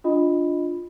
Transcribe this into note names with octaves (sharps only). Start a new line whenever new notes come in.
D4 F4 D#5 B5